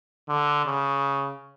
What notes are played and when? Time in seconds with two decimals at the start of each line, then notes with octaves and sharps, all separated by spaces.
0.29 D3
0.66 C#3